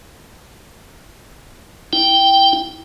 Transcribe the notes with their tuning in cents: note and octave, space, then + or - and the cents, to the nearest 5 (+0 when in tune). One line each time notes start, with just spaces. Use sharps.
E4 +0 G5 +0